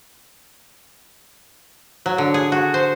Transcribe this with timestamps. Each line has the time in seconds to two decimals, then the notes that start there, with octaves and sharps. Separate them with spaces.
2.06 F#3
2.18 D3
2.34 G#4
2.52 F#4
2.74 C5